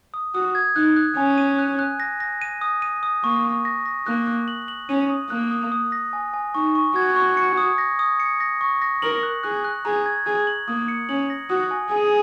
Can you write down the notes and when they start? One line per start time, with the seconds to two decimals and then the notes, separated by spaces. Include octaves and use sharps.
0.14 D#6
0.34 F#4 D#6
0.55 G#6
0.76 D#4 F#6
0.96 F#6
1.16 C#4 G#5
1.38 D#7
1.58 F#6
1.79 F#6
2.00 A#6
2.20 A#6
2.41 D#7
2.61 D#6
2.82 D#7
3.03 D#6
3.24 A#3 C#6
3.45 C#6
3.65 A#6
3.86 A#6
4.07 A#3 F#6
4.27 F#6
4.48 F#7
4.68 F#7
4.89 C#4 D#7
5.10 D#6
5.30 A#3 F#6
5.51 D#6
5.72 D#6
5.92 A#6
6.13 G#5
6.33 G#5
6.54 D#4 C#6
6.75 C#6
6.95 F#4 G#6
7.16 C#6
7.37 C#7
7.57 D#6
7.78 A#6
7.99 D#6
8.20 C#7
8.40 A#6
8.61 C#6
8.82 A#6
9.02 A#4 F#7
9.23 F#6
9.43 G#4 F#6
9.64 F#6
9.85 G#4 A#5
10.06 G#6
10.26 G#4 G#6
10.47 F#7
10.68 A#3 D#6
10.88 C#7
11.09 C#4 F#7
11.30 A#6
11.50 F#4 D#6
11.71 G#5
11.92 G#4 G#5